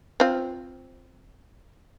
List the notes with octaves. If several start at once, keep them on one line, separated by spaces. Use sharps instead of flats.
C4 F4